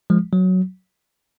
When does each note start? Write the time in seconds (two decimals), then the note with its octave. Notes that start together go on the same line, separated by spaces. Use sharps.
0.10 F3 G#3
0.33 F#3